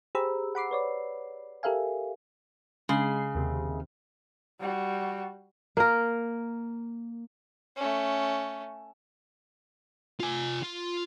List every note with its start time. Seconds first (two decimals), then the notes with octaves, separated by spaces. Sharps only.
0.15 G4 G#4 C5 A#5 B5 E6
0.55 F#5 B5 D6 C7
0.71 B4 C#5 D5
1.63 G4 A4 A#4 E5 F5 G#5
2.89 C#3 G#3 C7
3.35 D#2 C3
4.60 G3 F#4
5.77 A#3 A#4
7.77 A3 C#4
10.20 F4 G#5
10.62 F4